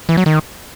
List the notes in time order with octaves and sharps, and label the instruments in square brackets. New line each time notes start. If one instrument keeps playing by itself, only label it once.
[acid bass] E3
F#3
D#3